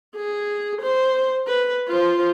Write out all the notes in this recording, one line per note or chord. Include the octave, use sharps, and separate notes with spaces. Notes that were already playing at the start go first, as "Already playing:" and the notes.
G#4
C5
B4
F4 C5